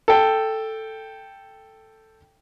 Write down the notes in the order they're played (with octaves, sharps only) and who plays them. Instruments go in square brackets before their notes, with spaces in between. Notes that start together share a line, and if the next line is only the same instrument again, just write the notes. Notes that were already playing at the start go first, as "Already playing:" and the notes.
[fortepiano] A4 G5